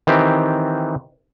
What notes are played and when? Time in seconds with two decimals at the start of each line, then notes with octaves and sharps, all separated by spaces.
0.07 D#3 E3 C4 G4